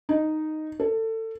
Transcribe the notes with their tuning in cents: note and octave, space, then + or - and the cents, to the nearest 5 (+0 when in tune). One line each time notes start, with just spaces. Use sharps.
D#4 -5
A4 +25